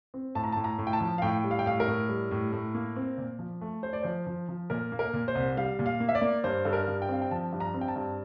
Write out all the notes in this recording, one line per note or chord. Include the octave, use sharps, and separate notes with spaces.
C4
A2 A5
A#5
A5
A2
A#5
A2
G5
A5
F3
F5
A2 G5
G3
F5
G5
A2 F5
A#4
A2
G3
A2
A2
A#3
C4
A#2
F3
A3
A3 C5
D5
F3 C5
F3
F3
A#2 A#4
A#3
A#4
A#2
C5
C2
G3 F5
A#2
F5
A#3
E5
D5
A#3
G2 C5
G2 A4
A#4
G2
G5
C4 F5
G5
F3 A5
G2
A#5
C4
G5
A5
G2